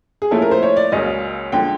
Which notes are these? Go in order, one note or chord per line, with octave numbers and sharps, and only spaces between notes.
G#4
A#2 F3 A3 C#4 E4 A4
A#4
C5
C#5
D5
C#2 C#3 F#3 A#3 C#4 D#5
D3 F3 G#3 G5